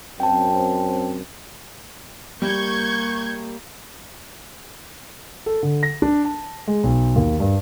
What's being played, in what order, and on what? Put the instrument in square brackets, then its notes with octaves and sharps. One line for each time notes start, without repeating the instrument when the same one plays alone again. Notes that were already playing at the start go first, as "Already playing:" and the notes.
[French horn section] F#2 C4 [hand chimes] G5 A5
[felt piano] G3 [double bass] A#3 [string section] C#6 G6 G#6
[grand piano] A4
D3
A#6
D4
A5
G#3
B1
D#2
G2